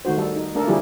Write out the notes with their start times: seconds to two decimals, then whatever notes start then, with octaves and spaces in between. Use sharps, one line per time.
0.05 D#3 A3 D#4 F#4 C5
0.18 G3 A4
0.36 D#4
0.55 A3 A#3 D4 A4 A#4
0.67 D3 F3 G3 E4 G4 G#4